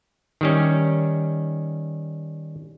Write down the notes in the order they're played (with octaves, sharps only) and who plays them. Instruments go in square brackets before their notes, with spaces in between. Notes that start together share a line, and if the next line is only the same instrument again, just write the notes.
[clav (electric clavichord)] D#3 G3 C#4